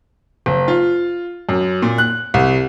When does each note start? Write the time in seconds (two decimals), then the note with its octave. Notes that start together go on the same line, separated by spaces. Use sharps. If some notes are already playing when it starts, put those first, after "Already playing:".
0.46 F#1
0.68 F4
1.49 F#2
1.82 A#2
1.98 F#6
2.34 C2